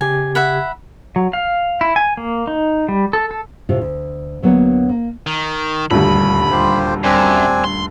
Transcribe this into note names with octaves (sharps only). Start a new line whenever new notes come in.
C#3 G4 G#5 G#6
E5 F#5 B5
F#3
F5
E4
G#5
A#3
D#4
G3
A4
A4
A2 C3 F4
D2
D2 F#3 A#3 B3 D4 C#5
A#3
D#3
D#1 D2 G2 B5
F4 G4 C5
F#2 C4 D4 G#5
C6